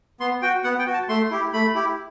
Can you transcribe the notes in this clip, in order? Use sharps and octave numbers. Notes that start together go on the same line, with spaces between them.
B3 C6
F#4 G5
B3 F#5
G5
F#4
A5
A3 C6
E4 G4
A3 B5
E4 G4